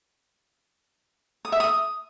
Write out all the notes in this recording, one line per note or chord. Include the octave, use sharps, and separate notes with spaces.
D#6
E5
D#6